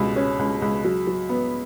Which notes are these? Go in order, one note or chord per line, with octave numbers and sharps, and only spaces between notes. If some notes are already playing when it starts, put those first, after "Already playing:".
Already playing: C#2 B2 G3
C#4
C#2
C#2
F#3
F#3
B3